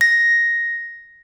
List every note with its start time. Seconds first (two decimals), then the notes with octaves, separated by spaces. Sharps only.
0.01 A#6